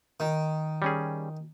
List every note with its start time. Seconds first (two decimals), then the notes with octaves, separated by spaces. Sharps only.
0.20 D#3
0.82 G3 C#4 G#4